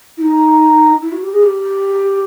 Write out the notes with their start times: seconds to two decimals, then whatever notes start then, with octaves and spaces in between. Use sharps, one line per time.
0.17 E4
0.21 D#4
1.02 E4
1.12 F#4
1.21 G4
1.33 G#4
1.43 G4